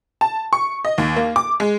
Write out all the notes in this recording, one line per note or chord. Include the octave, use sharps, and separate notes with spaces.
A5
C#6
D#5
D#2
A#3
D6
G#3